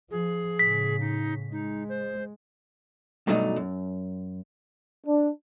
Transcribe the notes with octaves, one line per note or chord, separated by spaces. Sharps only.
F3 G#4
A2 C#3 B6
D#4
G#3 D#4
C5
G2 B2 F#3 A3 D#4 D5
F#2
D4